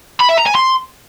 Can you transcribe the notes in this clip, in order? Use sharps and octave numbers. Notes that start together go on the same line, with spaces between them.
B5
E5
A#5
G#5
C6